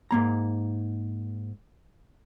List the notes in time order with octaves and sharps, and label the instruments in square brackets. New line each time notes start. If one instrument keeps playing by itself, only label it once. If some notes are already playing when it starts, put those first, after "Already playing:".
[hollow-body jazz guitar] G#2 A#3 A#5